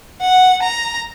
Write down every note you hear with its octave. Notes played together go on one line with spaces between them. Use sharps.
F#5
A#5